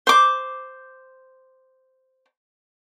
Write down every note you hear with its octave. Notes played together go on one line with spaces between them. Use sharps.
C5 D6